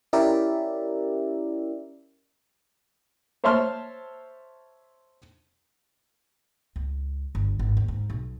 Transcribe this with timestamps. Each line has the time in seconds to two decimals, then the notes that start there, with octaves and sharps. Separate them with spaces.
0.13 C#4 E4 G4 A#4 D5 E5
3.44 C5 C#5 E5 A5 C6 F6
6.76 C#2
7.35 G1
7.59 G#1
7.77 D#2
7.88 G#2
8.10 B1